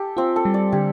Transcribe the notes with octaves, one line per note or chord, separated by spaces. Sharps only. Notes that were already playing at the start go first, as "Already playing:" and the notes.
Already playing: G4 A4
C4 F4
A4
G3
D5
D3 G4